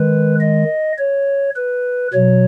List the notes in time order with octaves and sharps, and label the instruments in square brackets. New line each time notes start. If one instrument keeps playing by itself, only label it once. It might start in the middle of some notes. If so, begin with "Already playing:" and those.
Already playing: [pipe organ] D#3 G#3 B4
D#5
C#5
B4
B2 F#3 C#5